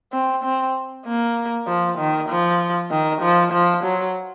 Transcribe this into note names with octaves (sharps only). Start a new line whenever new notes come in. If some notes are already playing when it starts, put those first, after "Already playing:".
C4
C4
A#3
F3
D#3
F3
D#3
F3
F3
F#3